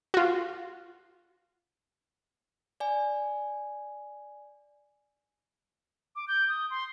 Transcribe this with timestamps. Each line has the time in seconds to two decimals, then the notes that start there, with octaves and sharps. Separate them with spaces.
0.14 F4 F#4
2.80 D5 G#5
6.16 D6
6.28 G6
6.49 D#6
6.70 C6